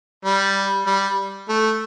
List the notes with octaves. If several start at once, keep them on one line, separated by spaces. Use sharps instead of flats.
G3
G3
A3